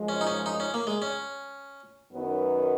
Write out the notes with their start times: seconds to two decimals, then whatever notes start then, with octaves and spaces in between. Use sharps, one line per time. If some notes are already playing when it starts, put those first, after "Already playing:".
Already playing: F#2 F3 G#3
0.09 C#4
0.21 D#4
0.27 C#4
0.46 D#4
0.60 C#4
0.74 A#3
0.87 G#3
1.02 C#4
2.13 F#2 D#3 F#3 B3